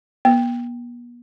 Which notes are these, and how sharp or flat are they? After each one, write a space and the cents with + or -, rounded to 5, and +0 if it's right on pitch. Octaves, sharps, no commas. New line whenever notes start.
B3 -45